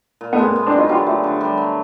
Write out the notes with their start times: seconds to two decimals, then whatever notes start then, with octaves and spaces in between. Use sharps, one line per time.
0.21 A#2
0.33 A3 B3
0.38 G#3
0.44 A#3 C4
0.56 B3
0.67 C4 D4
0.72 F#3
0.78 D#4 F4
0.89 D3 F4 G4
1.06 A3 F4 G4
1.24 D3
1.41 G3
1.58 F#3